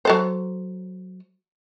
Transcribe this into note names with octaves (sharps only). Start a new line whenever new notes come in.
F#3 A4 C5